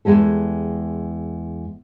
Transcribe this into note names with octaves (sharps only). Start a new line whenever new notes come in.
E2 C3 G#3 G4 A4